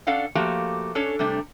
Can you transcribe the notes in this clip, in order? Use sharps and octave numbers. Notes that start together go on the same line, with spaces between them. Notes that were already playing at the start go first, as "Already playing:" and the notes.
C#4 D4 A4 D5 F5 F#5
F3 A3 A#3 F#4 G4
C#4 D4 A4 C#5
C3 G3 A3 D4